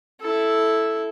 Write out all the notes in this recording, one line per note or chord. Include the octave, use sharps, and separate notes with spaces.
E4 A4